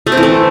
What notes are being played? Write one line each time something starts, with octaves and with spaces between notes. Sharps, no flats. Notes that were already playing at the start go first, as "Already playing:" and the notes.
A3
C4
E3
A3